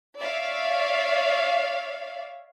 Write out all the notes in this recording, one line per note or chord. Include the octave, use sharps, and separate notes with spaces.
C#5 D5 E5 F5